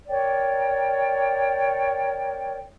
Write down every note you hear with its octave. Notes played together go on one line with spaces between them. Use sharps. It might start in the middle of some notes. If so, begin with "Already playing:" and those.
A#4 C#5 D5 G5